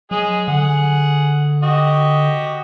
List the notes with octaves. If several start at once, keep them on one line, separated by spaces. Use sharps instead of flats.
F#3 G#3 G#4
D3 G#4 F#5
F#4 G4 D#5